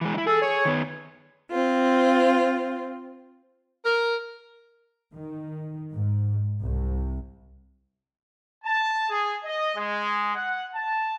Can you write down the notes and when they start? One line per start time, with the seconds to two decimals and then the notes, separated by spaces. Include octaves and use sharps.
0.01 E3 G#3
0.14 D#4 E4
0.27 G#4 A4
0.42 C#5
0.65 D#3 B3
1.50 C4 F4
3.85 A#4
5.16 D#3
5.92 G#2
6.61 C2
8.64 A5
9.10 G#4
9.44 D#5
9.76 G#3
10.35 F#5
10.73 A5